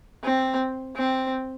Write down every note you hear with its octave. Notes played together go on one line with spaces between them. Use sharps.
C4
C4